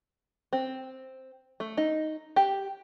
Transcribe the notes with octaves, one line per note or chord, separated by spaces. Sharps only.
C4
A3
D#4
G4